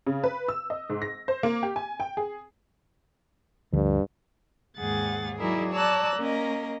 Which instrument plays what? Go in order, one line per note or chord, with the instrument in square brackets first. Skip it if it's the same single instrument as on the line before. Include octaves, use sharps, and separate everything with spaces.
[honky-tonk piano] C#3
B4
E6
D#5
G#2
A#6
C5
A#3
G4
G#5
G5
G#4
[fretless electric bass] D2 D3 F3 [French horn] G2
[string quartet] D#2 G#2 G#4 F#5 A6
F#3 D#4 E4 G#4 A#4 D5
C#5 D5 A5 A#5 E6 F#6
A#3 C#4 A#4 D#5